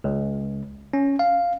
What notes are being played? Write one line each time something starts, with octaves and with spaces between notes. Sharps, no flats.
C#2
C#4
F5